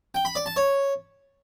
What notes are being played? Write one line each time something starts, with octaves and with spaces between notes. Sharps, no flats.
G5
B5
D5
A5
C#5